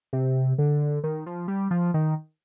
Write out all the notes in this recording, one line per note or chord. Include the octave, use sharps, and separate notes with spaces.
C3
D3
D#3
F3
G3
F3
D#3